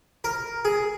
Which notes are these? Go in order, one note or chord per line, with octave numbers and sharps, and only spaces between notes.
A#4
G#4